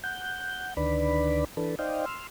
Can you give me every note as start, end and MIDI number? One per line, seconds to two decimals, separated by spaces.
0.04 0.74 78
0.04 0.74 91
0.77 1.45 38
0.77 1.45 51
0.77 1.45 62
0.77 1.45 71
0.77 1.45 74
0.77 1.45 83
1.57 1.76 52
1.57 1.76 62
1.57 1.76 69
1.57 1.76 71
1.79 2.05 63
1.79 2.05 72
1.79 2.05 74
1.79 2.05 75
1.79 2.05 77
1.79 2.05 79
2.06 2.27 84
2.06 2.27 88
2.06 2.27 89